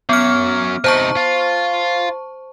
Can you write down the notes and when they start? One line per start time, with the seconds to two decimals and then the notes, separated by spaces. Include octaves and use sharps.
0.09 F#3 B3 C#4 F6
0.84 C3 D#4 C5 A5 C#6
1.16 F4